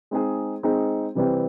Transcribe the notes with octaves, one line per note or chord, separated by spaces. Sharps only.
G#3 C4 D#4 G#4
G#3 C4 D#4 G#4
C3 E3 G3 C4